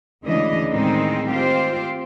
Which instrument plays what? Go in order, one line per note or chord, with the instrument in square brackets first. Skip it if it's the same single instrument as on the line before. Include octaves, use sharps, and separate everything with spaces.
[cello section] D2 C#3 E3 G#3 D4 D#5
A2 D#3 G#3 C4 D#4
C4 F4 G4 C5